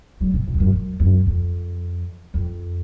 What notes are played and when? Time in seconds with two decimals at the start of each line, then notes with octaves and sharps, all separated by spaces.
0.21 F#3
0.34 C3
0.48 C3
0.54 F2
0.60 F#2
0.73 F#2
1.00 F#2
1.27 F2
2.34 F2